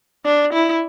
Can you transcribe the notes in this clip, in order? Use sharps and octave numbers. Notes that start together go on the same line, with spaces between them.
D4
E4